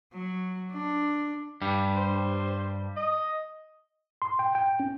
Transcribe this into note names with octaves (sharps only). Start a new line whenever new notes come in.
F#3
D4
G2 G3
C5
D#5
C6
G5
G5
C#4